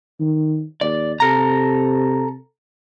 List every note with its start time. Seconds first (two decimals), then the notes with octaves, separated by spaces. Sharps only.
0.20 D#3
0.81 D#2 D5
1.20 C3 A4 A#5